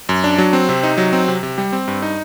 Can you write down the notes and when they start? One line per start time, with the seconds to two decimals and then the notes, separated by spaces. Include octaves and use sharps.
0.09 F#2
0.24 D4
0.38 F#3
0.53 C4
0.69 C3
0.83 D#4
0.98 F#3
1.13 C4
1.28 C3
1.43 C3
1.58 G3
1.72 C4
1.88 G2
2.02 D#4